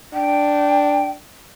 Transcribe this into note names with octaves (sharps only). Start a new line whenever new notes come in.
D4 G5